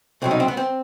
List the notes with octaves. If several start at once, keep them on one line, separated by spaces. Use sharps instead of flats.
C2 B2 F#3 C4
D#4
C4
B3
C4